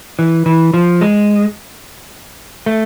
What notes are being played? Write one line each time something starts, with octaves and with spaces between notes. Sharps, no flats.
E3
E3
F3
G#3
A3